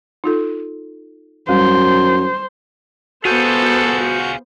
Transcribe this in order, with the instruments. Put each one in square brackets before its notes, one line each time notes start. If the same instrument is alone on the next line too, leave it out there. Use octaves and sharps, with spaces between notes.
[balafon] D#4 F4 A4
[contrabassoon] F#2 [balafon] G3 [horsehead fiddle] C5
[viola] B3 C5 [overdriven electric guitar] F4 G#4 [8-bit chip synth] F#4 G6 C#7 [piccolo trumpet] A4